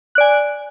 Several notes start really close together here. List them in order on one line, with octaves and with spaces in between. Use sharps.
F#6 D5 G#5